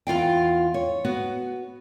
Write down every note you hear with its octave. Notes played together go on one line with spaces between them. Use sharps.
E2 F4 F5 G5
C#5
B3 F#4